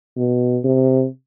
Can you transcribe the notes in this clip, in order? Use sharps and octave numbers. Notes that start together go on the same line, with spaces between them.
B2
C3